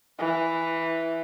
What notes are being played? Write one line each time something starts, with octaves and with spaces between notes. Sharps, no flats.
E3